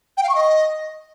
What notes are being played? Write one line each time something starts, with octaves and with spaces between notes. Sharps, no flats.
G5
F5
C#6
D#5